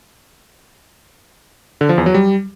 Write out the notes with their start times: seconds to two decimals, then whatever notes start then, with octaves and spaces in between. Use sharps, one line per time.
1.81 D3
1.89 F3
1.98 E2
2.06 F#3
2.14 G3